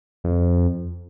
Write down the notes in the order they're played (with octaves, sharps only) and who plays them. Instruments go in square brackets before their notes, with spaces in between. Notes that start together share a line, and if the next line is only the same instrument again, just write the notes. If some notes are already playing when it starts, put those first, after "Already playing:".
[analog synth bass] F2